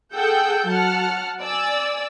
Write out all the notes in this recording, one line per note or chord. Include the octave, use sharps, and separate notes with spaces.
G#4 A4 F#5 G5 E6 G6
F#3 F#5 A5 F6
D5 G#5 E6